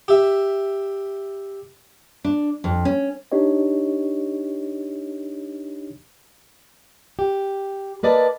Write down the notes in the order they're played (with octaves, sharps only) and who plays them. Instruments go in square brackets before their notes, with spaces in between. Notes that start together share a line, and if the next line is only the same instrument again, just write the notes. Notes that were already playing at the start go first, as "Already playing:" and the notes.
[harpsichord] G4 E5
[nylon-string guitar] D4
F2
C#4
[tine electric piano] D4 D#4 G4 C#5 D#5
[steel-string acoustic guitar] G4
A#3 B4 D5 D#5 A5